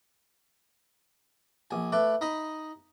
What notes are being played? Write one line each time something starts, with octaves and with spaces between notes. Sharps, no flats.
A#1 G#5
A3 B4 D5
D#4 D#5 B5